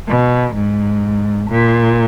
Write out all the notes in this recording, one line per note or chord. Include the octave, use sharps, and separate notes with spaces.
B2
G#2
A#2